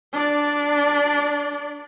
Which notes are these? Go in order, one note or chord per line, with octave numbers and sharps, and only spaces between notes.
D4 D5